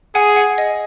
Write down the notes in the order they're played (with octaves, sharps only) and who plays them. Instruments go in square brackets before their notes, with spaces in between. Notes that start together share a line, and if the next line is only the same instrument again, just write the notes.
[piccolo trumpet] G#4 [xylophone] F#5 G#5
[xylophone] F#5
D#5